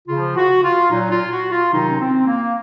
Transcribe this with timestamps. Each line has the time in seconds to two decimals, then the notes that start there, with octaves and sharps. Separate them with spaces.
0.08 C#3 F3 F4
0.36 F#4
0.63 F4
0.90 A#2 F#3 D#4
1.11 F4
1.31 F#4
1.51 F4
1.72 C3 D#3 F#3 D#4
1.88 C#4
1.99 C4
2.26 A#3